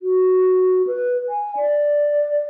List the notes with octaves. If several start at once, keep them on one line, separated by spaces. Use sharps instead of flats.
F#4
B4
G#5
D5